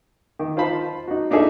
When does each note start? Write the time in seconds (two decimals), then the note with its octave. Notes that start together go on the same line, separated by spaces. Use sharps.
0.39 D#3
0.56 D#4 F4 C5 A5 B5
1.07 D#4 F#4
1.31 D4 D#4 F4 G#4 A4 E5